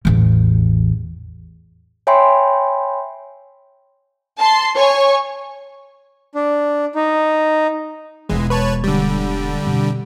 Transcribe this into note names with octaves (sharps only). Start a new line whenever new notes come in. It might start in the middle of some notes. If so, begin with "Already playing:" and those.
A1 E2
C#5 E5 G5 G#5 B5 C6
A5 C6
C#5 G#5 C#6
D4
D#4
E1 E3 G#3 F4
B4 C#5 A5
D3 G3
F2 B2